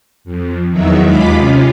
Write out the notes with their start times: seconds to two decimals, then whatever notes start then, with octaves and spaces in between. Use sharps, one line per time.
0.24 F2
0.70 E2 D#3 F#3 D#4 E5
1.03 D#2 G#3 F4 B5 D6 B6
1.35 C3 C#4 F4